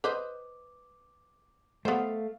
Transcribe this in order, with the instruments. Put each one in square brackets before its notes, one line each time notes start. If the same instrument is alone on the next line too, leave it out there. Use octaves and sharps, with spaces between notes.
[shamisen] B4 C5 D#5 [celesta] D6
[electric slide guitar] A3 F5 [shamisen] B3 C5